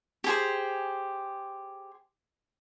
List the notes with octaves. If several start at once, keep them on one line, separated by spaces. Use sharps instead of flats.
G4 G#4 C5